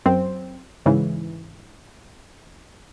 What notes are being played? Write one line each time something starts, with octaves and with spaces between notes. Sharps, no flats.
F#2 C4
G#2 C#3 E3